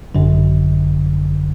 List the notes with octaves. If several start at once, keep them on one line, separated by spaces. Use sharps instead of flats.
G#1 F#2 D3